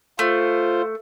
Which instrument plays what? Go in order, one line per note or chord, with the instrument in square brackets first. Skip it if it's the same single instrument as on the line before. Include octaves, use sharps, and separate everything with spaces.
[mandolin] A3 [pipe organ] F4 C5